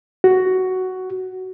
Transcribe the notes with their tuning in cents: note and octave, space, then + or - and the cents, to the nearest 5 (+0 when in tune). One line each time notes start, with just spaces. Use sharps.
F#4 +10